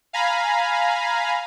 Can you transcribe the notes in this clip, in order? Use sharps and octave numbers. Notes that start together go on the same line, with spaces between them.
F5 G#5 A#5 B5